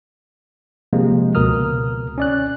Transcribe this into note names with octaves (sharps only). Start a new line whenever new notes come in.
C3 F3 G#3 A#3
C#2 B2 A#4 D#6 F6
C#4 D5 F#6